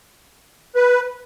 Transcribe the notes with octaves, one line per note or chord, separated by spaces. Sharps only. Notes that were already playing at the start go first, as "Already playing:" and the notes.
B4